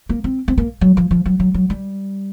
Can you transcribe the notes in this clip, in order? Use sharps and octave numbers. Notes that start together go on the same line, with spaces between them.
A#3
C4
C4
A#3
F#3
F3
F3
F#3
F#3
F#3
G3